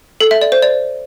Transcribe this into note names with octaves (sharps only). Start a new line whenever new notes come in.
A4
E5
D5
C5
D5